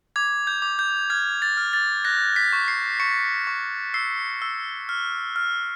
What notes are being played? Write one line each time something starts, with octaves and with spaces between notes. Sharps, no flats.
D6 G#6
G6
D6
G6
F6 G#6
A6
F6
A6
F#6 A#6
B6
C#6
C7
C#6 C#7
C#6
E6 C7
E6
F6
F6